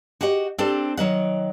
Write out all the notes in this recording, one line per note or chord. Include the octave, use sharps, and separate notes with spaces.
F#4 G4 D#5 F#5
C4 D4 G4 A4 C5
D#3 F#3 D#5 F#5